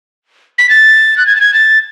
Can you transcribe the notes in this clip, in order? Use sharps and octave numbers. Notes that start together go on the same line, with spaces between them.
B6
A6
F#6
G#6
A6
G#6
A6